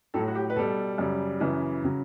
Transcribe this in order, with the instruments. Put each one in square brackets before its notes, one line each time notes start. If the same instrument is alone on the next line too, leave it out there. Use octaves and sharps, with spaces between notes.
[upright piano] A2 F#3 A4
F#4
G4
B4
B2 G3 A4
F#2 C#3 G3
F#2 C#3 E3
C#3 F#3